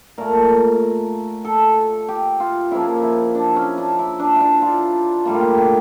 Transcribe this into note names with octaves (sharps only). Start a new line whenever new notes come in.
A#2 A3 A#4
A4
G4
F4
C#3 F3 A#3 E4
E4
D4
C#4
D4
E4
D4
D4 E4
F4
A2 G3 A#3
F4
G4
G4